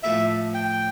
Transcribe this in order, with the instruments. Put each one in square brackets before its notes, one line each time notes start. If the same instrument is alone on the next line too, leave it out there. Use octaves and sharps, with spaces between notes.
[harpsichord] A2 F3 A3 E4 [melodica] E5
[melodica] G5